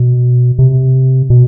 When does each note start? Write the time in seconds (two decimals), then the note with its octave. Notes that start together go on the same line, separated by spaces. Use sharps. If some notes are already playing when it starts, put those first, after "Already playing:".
Already playing: B2
0.59 C3
1.30 B2